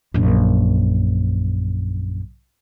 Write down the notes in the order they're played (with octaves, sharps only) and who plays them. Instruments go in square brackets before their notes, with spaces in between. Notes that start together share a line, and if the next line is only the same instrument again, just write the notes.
[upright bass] A#1 F#2